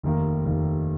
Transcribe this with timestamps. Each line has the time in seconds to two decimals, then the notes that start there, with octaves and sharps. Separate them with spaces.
0.03 F1 D#2 D#3 A#3
0.46 F1 D#2 D#3 A#3